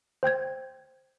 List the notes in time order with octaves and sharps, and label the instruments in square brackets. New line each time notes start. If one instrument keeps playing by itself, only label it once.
[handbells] C5 G5 G6 G#6